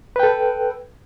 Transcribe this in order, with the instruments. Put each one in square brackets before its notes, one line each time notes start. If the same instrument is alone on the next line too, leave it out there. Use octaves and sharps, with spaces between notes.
[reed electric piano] B4
G5
A4